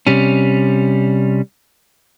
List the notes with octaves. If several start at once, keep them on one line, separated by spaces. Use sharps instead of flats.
C3 G3 C#4